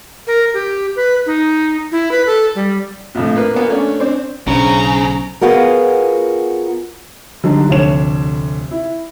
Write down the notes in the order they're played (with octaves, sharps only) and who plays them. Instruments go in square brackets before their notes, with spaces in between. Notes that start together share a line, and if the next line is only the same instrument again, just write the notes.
[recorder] A#4
G4
B4
D#4
E4
B4
A4
G3
[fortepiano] A#1 F2 A2
A#3 B4
A#3 B3 F#4
A3 C#4 D4
C4 D4
[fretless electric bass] B1 [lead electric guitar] C#3 [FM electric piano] C#4 D4 C5 [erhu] A#5
[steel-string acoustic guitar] B3 F4 F#4 G#4 A#4
[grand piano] D3 F#3 G3 D4 D#4
F1 D2 D4 C#5 E7
E4